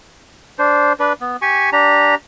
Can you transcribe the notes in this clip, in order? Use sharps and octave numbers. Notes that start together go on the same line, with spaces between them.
D4 C5
D4 B4
B3
G4 G#5 C#6
D4 G4 A#5